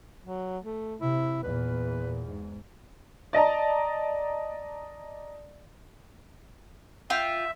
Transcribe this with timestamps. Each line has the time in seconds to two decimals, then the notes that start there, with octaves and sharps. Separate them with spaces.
0.27 F#3
0.64 A3
1.01 C3 E4
1.43 E2 A#2 B4
2.26 G#2
3.33 D5 D#5 A5 A#5
7.10 F4 E5 G5